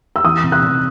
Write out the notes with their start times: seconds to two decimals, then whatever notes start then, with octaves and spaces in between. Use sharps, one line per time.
0.16 E6
0.24 E3 D#6
0.43 C3
0.52 F#6
0.62 C3